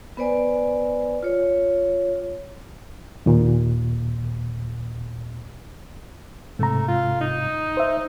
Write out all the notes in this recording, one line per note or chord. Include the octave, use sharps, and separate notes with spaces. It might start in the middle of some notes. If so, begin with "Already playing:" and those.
B3 B4 C5 D5 G#5
F4 C#5
D#2 A#2
G#2 C3 A3 A#5
F4
D#4
C5 E5